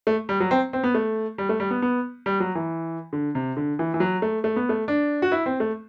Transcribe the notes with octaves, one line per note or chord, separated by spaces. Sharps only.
A3
G3
F#3
C4
C4
B3
A3
G3
A3
G3
B3
B3
G3
F#3
E3
D3
C3
D3
E3
E3
F#3
A3
A3
B3
A3
D4
F#4
E4
C4
A3